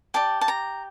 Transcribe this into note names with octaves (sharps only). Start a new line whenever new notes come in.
G4 D5 A5
A5
A#5